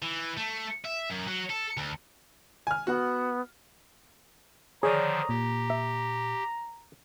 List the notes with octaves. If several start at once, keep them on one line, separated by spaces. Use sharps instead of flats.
E3
A3
E5
F#2
F#3
A4
D2
G#5 F6
B3 F#4 F#5
D3 D#3 F3 G#4 C#5 D5 A#5 D#6
A#2 G4
E5